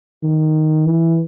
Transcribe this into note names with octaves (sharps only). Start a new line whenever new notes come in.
D#3
E3